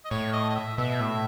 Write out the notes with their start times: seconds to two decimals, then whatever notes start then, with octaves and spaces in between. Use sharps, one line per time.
0.05 D#5
0.11 A2 C#5
0.33 D#5
0.50 D#5
0.55 E5
0.77 B2 E5
1.01 A2